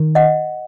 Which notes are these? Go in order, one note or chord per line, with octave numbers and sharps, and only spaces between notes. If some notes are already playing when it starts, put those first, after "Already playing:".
Already playing: D#3
D#5 F#5